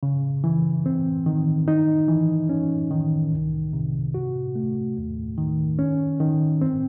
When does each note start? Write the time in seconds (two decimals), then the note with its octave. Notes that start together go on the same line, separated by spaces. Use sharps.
0.03 C#3
0.44 E3
0.86 C4
1.26 D#3
1.68 D#4
2.08 E3
2.49 C#4
2.91 D#3
3.32 C2
3.73 C3
4.14 F#4
4.55 A3
4.97 D#2
5.38 D#3
5.79 C#4
6.20 D#3
6.61 C4